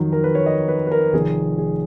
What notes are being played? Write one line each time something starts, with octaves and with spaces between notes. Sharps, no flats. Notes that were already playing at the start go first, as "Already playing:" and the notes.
Already playing: F2 D#3 F#3
A#4
B4
C#5
D#5
B4
B4
A#4
F1 F2 D#3 G#4
G#4